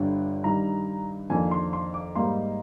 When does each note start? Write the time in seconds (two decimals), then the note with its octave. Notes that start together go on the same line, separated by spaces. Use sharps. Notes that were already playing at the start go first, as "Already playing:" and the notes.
Already playing: G1 G2 D3 G3 D4
0.44 G2 D#3 G3 A#5
1.30 F2 D#3 A#3 D4 G#5
1.51 C6
1.73 C6
1.94 D6
2.15 G#2 G3 A#3 D#4 C6